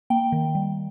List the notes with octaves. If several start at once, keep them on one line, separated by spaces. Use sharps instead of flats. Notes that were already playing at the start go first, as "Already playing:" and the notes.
A#3 G5
D#3
G3